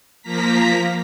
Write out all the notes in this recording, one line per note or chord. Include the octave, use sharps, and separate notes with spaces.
F3 A#3 A#5 B6